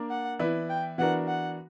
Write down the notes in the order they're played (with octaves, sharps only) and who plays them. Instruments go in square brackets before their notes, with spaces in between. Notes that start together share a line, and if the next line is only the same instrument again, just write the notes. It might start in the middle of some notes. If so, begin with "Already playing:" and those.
Already playing: [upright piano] A#3 D4 A#4 D5
[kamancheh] F#5
[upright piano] E3 B3 E4 B4 D5
[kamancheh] G5
[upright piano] E3 B3 D4 F#4 A#4 [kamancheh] F#5
[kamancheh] F#5